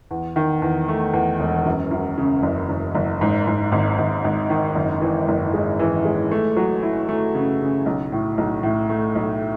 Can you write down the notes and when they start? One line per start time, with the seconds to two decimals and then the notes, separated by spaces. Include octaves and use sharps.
0.11 E2
0.36 D#3
0.62 E2
0.88 A3
1.13 E2
1.40 E1
1.66 F#2
1.91 F#2
2.18 C#3
2.43 F#1
2.69 F#1
2.95 F#1
3.21 G#2
3.47 G#2
3.72 G#1
3.98 G#1
4.24 G#1
4.50 D#3
4.75 F#1
5.01 E3
5.28 F#1
5.54 G#3
5.79 E3
6.05 G#3
6.31 A3
6.56 F#3
6.82 E4
7.09 A3
7.35 C#3
7.61 C#3
7.86 B1
8.12 A2
8.38 B1
8.63 A2
8.89 A3
9.15 B1